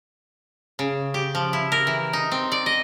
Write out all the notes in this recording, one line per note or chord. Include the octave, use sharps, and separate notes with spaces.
C#3
G4
F3
E4
A#4
E3
D#4
C4
D5
D#5